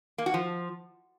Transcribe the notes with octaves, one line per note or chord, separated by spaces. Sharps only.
A#3
F#4
F3